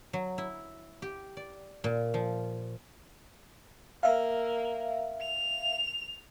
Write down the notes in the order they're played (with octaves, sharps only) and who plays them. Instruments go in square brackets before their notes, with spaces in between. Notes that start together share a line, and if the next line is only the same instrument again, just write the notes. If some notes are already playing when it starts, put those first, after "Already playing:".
[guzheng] F#3
E4
G4
D5
A#2
F3
[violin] A#3 [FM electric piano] E5 F5
[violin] F7